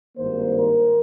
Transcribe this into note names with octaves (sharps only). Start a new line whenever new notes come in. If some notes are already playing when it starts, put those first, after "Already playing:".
G#1 G2 D#3 A#3 C5
A#4